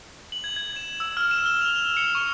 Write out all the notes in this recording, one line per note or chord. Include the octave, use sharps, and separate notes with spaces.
F#7
G#6
G#6
E7
E6
F6
E7
G7
F7
F7
C#7
C#6